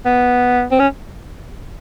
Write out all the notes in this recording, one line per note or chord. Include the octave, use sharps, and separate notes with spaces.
B3
C4
C#4